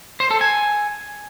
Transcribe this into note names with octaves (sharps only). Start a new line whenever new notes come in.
C5
A4
G#5